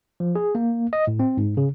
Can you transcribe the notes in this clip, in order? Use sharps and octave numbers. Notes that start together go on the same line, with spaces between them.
F3
G#4
A#3
D#5
A2
C4
G#2
C#3